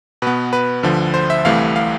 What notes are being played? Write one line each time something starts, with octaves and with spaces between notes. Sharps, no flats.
B2 B3 B4
B4
D2 D3 F3
C5
E5
C2 C3 E3 A3 F5
F5